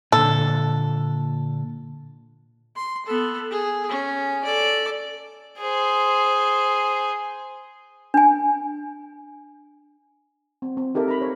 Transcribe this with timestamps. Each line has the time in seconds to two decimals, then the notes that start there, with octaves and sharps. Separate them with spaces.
0.12 A#2 D3 A4
2.76 C6
3.06 B3 A4
3.51 G#4
3.89 C#4
4.44 A4 D5
5.58 G#4 C5
8.14 D4 G#5
10.62 C4
10.77 C4
10.95 D#4 G4 A4 A#4 E5
11.08 A#5 B5
11.20 C5 C#5